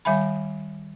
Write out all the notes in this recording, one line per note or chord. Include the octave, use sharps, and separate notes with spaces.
D#3 G3 E5 G#5 B5